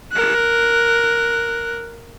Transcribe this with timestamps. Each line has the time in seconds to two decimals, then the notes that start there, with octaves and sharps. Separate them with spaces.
0.12 A#4 F#6